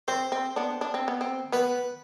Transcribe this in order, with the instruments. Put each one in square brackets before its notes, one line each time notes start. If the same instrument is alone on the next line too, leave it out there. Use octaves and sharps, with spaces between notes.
[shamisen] C4 [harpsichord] C5
[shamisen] C4
B3 D4
D4
C4
B3
C4
[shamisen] B3 [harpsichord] B4